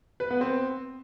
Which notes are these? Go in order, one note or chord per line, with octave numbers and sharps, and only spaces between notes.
B4
B3
C4